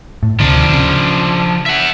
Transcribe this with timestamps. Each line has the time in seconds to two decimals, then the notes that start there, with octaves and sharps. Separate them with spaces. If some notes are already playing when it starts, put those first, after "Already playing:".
0.23 A2
0.40 D2 C3 D#3 F3 D4
0.73 C#3
1.66 E5 F#5